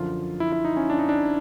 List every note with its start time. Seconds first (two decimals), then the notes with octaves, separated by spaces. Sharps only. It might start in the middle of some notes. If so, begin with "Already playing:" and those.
Already playing: F#2 D3 F3 F4
0.40 E4
0.52 E4
0.65 D#4
0.77 C#4
0.90 D4
0.99 D#4
1.09 D4